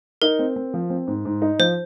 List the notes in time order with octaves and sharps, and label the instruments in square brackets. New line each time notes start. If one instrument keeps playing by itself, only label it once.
[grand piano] D#4 [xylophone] A#4
[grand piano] C4
C4
F3
C4
G#2
G#2
D#4
[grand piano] F3 [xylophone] C5